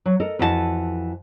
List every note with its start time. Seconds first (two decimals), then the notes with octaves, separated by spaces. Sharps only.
0.06 F#3
0.20 A4 A#4 D#5
0.39 F2 E3 F#4 G4 A5